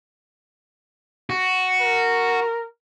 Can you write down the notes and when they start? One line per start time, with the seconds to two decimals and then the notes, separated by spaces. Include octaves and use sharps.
1.30 F#4
1.82 A#4